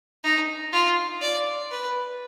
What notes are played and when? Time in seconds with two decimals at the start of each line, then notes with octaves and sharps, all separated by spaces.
0.24 D#4
0.73 F4
1.22 D5
1.71 B4